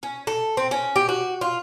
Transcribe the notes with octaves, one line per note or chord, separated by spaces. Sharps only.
C#4
A4
C4
C#4
G4
F#4
F4